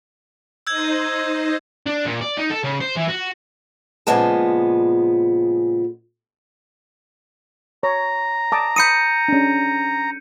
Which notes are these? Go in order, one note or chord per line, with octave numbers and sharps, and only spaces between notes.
D#4 C5 D#5 E6 G6 G#6
D4
A#2
D5
D#4
A4
C#3
C5
E3
F#4
A#2 C#3 F3 G#3 B3 A5
C#5 A#5
A5 D6 D#6
B5 D#6 G6 C#7 D#7
C#4 D4